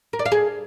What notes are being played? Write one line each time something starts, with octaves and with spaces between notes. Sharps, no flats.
A#4
D5
F5
G#4